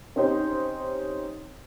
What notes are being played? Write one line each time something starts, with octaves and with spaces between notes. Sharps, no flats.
C4 C#4 D#4 G4 C5